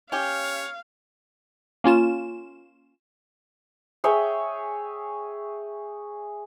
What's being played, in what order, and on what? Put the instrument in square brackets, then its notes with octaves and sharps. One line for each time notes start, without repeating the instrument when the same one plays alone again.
[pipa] C#4 G4 [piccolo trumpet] C#5 [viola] F5
[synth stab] A#3 C#4 F4 E7
[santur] G#4 C#5 E5 G5